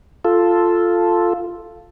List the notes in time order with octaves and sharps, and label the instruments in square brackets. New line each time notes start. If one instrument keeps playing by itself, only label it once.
[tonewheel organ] F4 A4